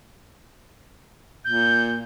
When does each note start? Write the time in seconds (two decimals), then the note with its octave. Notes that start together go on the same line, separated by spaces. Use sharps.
1.45 A#2 G6